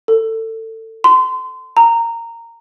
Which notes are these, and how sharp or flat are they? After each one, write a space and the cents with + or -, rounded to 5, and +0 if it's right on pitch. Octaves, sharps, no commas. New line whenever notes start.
A4 +25
C6 -25
A#5 -15